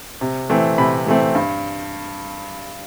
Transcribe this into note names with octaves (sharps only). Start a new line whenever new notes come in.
C3
E3 A3 C4
C3 B5
E3 A3 C4
G2